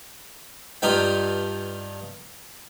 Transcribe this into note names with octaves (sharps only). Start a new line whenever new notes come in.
G2 D#4 F4 B4 G5